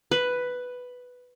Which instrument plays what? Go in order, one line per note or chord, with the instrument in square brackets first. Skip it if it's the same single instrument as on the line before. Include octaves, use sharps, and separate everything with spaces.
[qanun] B4